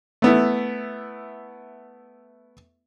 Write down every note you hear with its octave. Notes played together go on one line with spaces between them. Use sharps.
A3 B3 E4